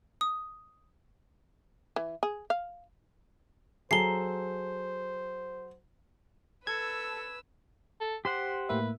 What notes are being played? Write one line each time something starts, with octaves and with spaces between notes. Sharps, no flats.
D#6
E3
G#4
F5
F#3 G#4 A4 C5 A#5 C7 G7
A4 B4 E6 G#6
A4
G4 C5 F#5 C6
A2 A#3 B4 E5